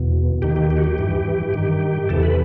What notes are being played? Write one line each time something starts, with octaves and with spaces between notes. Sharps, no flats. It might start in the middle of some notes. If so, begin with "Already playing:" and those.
Already playing: E2 B2
D#2 D#3 G4
G4
G4
F#4
G4
G2 E3
G2 D#3
E2 C3 E3 A4
B4